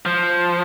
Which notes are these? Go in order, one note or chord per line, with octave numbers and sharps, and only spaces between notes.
F3